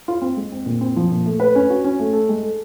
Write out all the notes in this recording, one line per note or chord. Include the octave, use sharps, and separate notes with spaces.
F4
C4
G#3
C4
A#2
C4
F3
A#2
A3
B4
C#4
F#4
C#4
A3
A4
G#3
A4